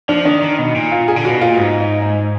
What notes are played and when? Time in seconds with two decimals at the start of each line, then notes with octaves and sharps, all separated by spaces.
0.09 F3 D4
0.25 D#3 D4
0.42 D#3
0.58 B2 D#4
0.75 A#2
0.92 F4
1.08 G#4
1.16 D3
1.25 F#4
1.30 B2
1.41 A#2 F4
1.57 G#2 D#4
1.80 D#4
2.02 D#4